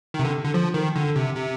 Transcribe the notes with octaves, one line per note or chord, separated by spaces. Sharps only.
D#3
C3
D3
D3
F3
D#3
D3
C3
C3